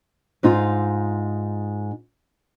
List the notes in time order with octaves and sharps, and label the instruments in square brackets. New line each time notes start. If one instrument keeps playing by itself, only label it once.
[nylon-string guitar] G#2 D#4 F4